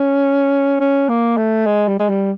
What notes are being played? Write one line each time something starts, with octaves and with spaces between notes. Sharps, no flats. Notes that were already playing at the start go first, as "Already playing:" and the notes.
Already playing: C#4
C#4
A#3
A3
G#3
G3
G#3
G3